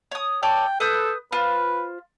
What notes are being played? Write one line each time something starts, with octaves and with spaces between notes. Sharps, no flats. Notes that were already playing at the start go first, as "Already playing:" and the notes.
C#5 D#6
A4 C#5 D5 G5
A4 B4 D#6 G6
F4 B4 C5